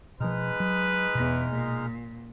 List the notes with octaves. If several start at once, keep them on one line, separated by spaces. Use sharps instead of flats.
B2 F3 G#3 D#4 B4 F6
F#3
E2 B2
A#2